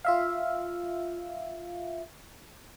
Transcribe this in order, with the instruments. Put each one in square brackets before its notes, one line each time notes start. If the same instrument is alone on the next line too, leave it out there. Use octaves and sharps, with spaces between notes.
[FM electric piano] F4 E5 F5